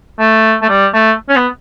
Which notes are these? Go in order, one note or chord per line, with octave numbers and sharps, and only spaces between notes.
A3
A3
G3
A3
C#4
B3